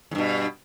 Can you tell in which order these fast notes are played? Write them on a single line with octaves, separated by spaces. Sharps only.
E2 G2 B2